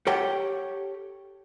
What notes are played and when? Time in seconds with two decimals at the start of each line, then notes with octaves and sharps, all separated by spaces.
0.07 G4 A4 C#5 F#5 G5